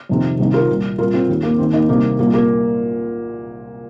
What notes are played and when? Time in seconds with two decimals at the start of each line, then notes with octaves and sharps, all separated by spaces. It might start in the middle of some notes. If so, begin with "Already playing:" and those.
0.09 F2 C3 D#3
0.38 C2 C3 D#3
0.54 F4 A#4
0.69 C2 A#2
0.98 C2 A#2 F4 A#4
1.14 C4 F4
1.28 D#2 D#3
1.43 A#3
1.58 D#2 D#3 C4
1.73 A#3 D#4
1.89 C2 C3 D#3 A#3 D#4
2.19 C2 A#2 A#3
2.34 A#3